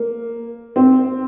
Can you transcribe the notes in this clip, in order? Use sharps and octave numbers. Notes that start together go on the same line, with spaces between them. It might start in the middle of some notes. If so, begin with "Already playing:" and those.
Already playing: A#3
C4